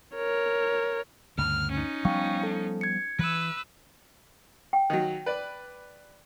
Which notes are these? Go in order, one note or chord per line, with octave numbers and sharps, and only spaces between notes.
A#4 C#5
D2 G2 C#3 F6
C#4 D#4
F3 G3 B3 F5 G5 C#6
A4
G#6 C#7
E3 B4 E6
G5
D#3 F#3
B4 D5